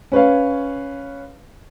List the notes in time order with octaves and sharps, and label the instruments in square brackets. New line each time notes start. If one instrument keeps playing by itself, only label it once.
[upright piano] C#4 B4 C#5 F5